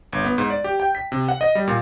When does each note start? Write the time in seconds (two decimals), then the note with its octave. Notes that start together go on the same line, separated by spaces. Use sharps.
0.13 G1
0.25 B3
0.38 G#2
0.50 D5
0.64 G4
0.80 G5
0.95 B6
1.12 C3
1.28 F#5
1.41 D#5
1.55 G3
1.68 A#2